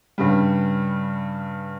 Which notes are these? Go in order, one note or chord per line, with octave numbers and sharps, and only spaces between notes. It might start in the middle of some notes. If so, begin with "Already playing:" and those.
G2 C#3 G3